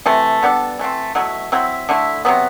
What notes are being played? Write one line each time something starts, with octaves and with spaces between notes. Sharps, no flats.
C3 E3 A3
G3 B3 D4 A4
E3 A3 C4
B2 F#3 A3 E4
F#3 C4 E4
D3 A3 E4
C3 F#3 B3